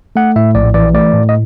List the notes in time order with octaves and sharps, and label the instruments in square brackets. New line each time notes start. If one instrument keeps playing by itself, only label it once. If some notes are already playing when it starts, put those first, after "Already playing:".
[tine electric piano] A3 F#5
A2 E5
A#1 D5
E3 D5
A3 D5
A2
D#5